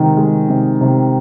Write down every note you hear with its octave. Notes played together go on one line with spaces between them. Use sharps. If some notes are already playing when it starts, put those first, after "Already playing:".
Already playing: C3 D#3 G#3
G#3
C3
C3